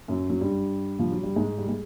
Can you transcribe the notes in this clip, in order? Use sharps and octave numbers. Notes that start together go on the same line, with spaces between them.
F#2 F#3
F#3
G2 G3
F3
F#3
G3
G#2 G#3
G3
G#3